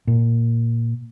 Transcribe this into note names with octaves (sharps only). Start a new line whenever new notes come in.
A#2